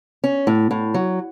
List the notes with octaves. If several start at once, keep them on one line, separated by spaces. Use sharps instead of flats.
C#4
A2
A2
F#3